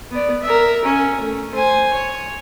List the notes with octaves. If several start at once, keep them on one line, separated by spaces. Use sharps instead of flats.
B3 D5
A#4 E5
C#4
A3
C5 G#5
C#5